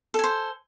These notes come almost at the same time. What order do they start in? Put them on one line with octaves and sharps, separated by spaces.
A4 G#5 C5